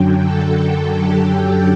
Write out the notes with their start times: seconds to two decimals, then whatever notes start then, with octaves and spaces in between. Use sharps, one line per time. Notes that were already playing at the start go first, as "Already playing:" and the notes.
Already playing: F#2 D3 F#3 G5
0.23 A4
1.01 G4